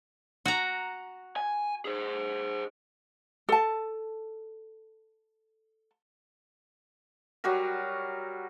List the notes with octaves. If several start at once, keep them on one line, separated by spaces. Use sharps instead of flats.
F#4 A#5
G#5
G#4 C5
A4 A5
F#3 G3 F#4 A#4